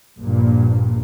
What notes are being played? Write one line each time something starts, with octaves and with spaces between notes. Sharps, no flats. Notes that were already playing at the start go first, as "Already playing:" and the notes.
A#1 G2 A#2